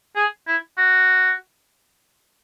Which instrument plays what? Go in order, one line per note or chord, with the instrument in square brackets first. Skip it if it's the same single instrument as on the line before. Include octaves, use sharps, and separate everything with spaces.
[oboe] G#4
E4
F#4